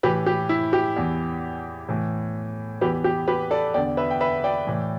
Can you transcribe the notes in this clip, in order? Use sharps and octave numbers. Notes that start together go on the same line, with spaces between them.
A2 E3 G4 B4
G4
E4
G4
E2 E3
A2 E3
E2 E3 G4 B4
G4
G4 B4
A4 D5
E2 D3 D5 G5
B4 E5
G5
B4 E5
D5 G5
A2 E3